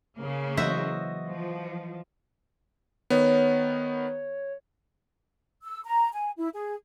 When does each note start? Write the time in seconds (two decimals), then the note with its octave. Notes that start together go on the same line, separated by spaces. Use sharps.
0.17 C#3 A#3
0.57 E3 F#3 F#4 C5 D#5 E5
1.27 F3
3.10 D#3 B3 C#5
5.63 E6
5.84 A#5
6.13 G#5
6.37 E4
6.54 G#4